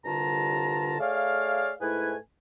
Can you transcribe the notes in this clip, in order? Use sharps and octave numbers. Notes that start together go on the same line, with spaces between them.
C2 G2 D3 F4 A5 A#5
A3 G#4 C#5 D5 F5
G#2 A3 E4 B4 G#5